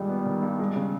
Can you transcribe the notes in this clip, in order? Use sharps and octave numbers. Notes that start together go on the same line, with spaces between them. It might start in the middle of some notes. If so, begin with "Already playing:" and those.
Already playing: G2 A#2 D#3 G3 G#3
B3
D#3
G2
G#3
C#3